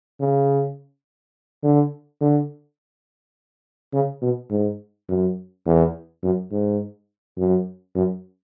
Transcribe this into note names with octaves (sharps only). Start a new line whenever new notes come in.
C#3
D3
D3
C#3
B2
G#2
F#2
E2
F#2
G#2
F#2
F#2